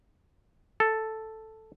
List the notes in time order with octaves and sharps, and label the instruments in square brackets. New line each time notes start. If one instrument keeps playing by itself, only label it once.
[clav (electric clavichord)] A4